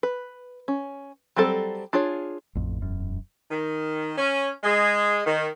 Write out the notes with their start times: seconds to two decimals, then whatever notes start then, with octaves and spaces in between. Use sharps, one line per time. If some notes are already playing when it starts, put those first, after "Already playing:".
0.03 B4
0.68 C#4
1.36 F#3 G3 C4 A4
1.93 D4 F4 G#4 C#5
2.55 A1 F2
2.81 E1 F#2
3.51 D#3
4.18 C#4
4.64 G#3
5.27 D#3